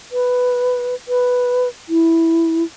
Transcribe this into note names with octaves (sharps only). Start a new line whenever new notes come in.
B4
B4
E4